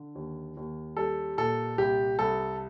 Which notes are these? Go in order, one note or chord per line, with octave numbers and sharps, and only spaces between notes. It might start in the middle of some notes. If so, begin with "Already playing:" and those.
Already playing: D3
D#2
D#2
G3 A4
A#2 A4
C2 G4
C2 A4